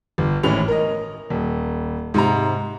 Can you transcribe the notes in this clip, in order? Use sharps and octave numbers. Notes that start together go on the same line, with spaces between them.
G1
G#1 A2 E3 C#4 F7
A#4 D#5
D#1
G#2 C3 A#5